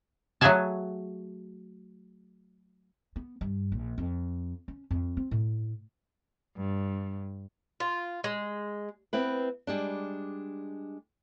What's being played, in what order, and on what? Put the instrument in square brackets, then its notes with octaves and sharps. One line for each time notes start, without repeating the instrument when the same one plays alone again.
[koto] F#3 A3 F#4 G#4 G#5 A5
[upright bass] B3
G2
A#1
F2
C#4
F2
C4
A2
[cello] G2
[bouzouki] F4
G#3
[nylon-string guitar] B3 C4 E4 B4
G3 G#3 D4